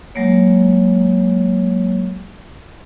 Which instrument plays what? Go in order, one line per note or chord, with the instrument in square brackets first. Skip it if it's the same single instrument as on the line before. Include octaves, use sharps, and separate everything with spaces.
[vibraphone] F#3 G#3 A#3 C#5